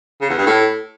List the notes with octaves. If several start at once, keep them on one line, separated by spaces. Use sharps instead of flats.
C#3
E2
G2
A2